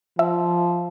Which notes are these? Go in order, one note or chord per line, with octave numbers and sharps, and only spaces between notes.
F3 E5